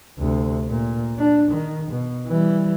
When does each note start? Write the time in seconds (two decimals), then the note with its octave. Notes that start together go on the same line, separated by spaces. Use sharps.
0.19 D2 C3
0.69 A#2
1.18 D4
1.52 D#3
1.91 B2
2.27 E3 G3